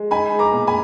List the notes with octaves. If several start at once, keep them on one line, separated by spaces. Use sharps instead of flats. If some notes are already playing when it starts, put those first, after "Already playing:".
Already playing: G#3
D#4 G#5 B5
G#3
A#5 D6
A#2
G#5 B5